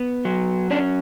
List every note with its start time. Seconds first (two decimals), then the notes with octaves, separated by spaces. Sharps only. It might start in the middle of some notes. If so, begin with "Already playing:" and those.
Already playing: B3
0.25 F#3
0.70 C#4 D4